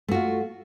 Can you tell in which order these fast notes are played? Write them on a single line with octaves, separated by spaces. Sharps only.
A3 F#4 F4